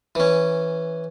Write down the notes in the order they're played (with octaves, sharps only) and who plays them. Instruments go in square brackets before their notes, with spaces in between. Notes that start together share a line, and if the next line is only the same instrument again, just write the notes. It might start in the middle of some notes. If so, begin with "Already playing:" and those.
[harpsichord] E3 C#4